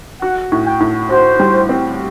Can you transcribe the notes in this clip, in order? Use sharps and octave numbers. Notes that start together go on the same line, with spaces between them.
F#4 F#5
A2
G5
A2
F#4 C5
G3
C4